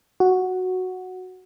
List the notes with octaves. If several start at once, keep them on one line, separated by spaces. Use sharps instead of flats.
F#4